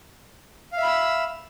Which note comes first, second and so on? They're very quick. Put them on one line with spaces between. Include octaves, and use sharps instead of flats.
F5 E5 B5 E6